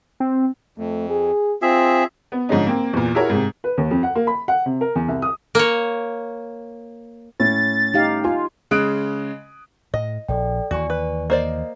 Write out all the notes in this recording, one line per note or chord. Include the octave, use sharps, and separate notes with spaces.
C4
F2 A3
G#4
C4 F4 G#4 E5
B3
G#2 D3 F3 G#3 C#4 D#4
A#3 C4
E2 A#2
E4 F#4 G#4 A#4 C#5
G#2 C3
B4
D#2
F2
F#5
A#3
B5
F#5
C3
A#4
E2
C2
D#6
A#3 C#5
A2 C#4 E4 A6
D#4 G4 F5
F4 G#5
C#3 G#3 D#6 F#6 D7
A2 D#5
A#1 A4 D5 G5
D#2 E3 F#4 D5 G#5 C#6
B4
A#3 C5 D5 D#5